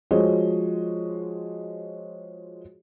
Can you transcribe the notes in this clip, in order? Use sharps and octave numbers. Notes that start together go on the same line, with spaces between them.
F3 G#3 F#4 C5 C#5 D#5